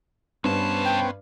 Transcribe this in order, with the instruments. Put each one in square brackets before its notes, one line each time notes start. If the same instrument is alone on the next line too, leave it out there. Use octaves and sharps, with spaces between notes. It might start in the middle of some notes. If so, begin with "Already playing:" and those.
[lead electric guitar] C2 A5 [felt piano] G2 [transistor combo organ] B3 C#4 C5
[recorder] G5